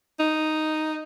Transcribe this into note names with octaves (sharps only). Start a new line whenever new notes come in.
D#4